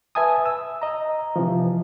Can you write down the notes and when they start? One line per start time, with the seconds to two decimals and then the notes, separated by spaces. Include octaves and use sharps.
0.15 B4 E5 G#5 A5 D#6
0.46 E6
0.82 D#5 A#5
1.36 C3 E3 F3